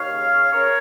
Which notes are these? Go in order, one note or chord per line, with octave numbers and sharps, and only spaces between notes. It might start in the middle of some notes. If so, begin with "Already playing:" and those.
Already playing: D#2 C#5 F5
C#3
C#3
C#3 A#4 C#5